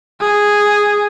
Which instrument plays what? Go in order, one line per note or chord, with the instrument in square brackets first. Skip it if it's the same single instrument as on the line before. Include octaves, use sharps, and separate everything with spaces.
[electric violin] G#4